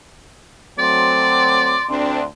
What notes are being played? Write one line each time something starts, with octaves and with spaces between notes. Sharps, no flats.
F#3 A3 C4 D5 C6
D2 C4 D4